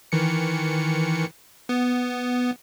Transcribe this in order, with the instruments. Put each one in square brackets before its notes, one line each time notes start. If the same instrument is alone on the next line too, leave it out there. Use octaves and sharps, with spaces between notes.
[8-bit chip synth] D#3 E3 C#7
B3